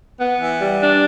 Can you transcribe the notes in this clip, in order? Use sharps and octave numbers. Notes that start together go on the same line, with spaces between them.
B3
E3
G3
D4